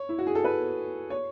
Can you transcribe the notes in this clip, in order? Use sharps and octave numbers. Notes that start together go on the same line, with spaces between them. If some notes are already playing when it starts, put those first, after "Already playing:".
Already playing: C#5
E4
F#4
G#4
A4
B4
C#5